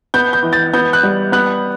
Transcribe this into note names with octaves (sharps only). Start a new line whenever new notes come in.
B3 G6
G6
E3
A6
B3 G6
F#6
G3
B3 F#6